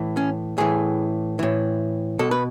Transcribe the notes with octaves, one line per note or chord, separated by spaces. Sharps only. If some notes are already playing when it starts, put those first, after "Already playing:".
Already playing: A2 E3
C#4
A2 E3 G#4
A2 E3
B2 A4
B4